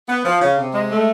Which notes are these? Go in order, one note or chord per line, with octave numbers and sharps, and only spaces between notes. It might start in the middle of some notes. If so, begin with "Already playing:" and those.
B3
F3
C#3
C3
G#3
A3